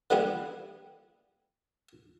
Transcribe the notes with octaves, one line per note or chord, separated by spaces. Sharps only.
D3 E3 G3 A#3 B3 E4